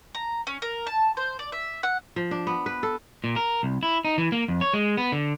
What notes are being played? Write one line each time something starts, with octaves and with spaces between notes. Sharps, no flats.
A#5
C#4
A#4
A5
C5
D5
E5
F#5
F3
D4
B3
B4
A4
A#2
A#4
C2
E4
D#4
E3
A#3
F2
C#5
G#3
B3
D3